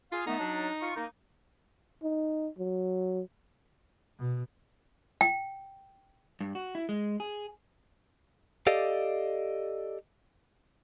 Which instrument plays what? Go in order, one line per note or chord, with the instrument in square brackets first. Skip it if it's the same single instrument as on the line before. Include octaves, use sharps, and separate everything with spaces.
[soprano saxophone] F4 [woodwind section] G#4 F5
[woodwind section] D#3 A3 B3 [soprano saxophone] D#4
[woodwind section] F#3 D4
F4 C#6
A#3 D#4
[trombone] D#4
F#3
[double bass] B2
[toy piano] G5
[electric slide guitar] G2
F#4
E4
G#3
G#4
[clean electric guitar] G4 A4 D5 D#5 F5